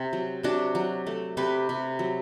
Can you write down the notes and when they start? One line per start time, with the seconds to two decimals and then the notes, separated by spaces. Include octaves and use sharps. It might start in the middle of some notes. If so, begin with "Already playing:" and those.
Already playing: C3
0.13 F#3
0.43 C3 D4 F#4
0.75 F#3
1.07 A3
1.37 C3 G4 B4
1.69 C3
1.99 F#3